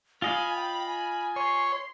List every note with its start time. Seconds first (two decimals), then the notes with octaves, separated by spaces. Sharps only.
0.22 F4 D#5 F5 G#5 B5
0.56 G5
0.86 G#5
1.36 C#5 C6 C7